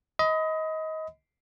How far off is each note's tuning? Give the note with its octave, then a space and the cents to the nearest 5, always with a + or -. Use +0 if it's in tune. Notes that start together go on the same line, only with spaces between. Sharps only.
D#5 +25 B5 +30